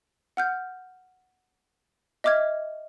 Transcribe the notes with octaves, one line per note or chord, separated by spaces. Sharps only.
F#5 F6 G6
D#5 E5 D6 F6 G#6